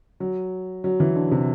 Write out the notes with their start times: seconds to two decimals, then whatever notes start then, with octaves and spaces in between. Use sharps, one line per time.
0.20 F#3
0.84 F#3
1.00 E3
1.15 D3
1.31 C3